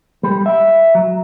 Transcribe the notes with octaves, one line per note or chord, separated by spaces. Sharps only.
G3
E5
F#3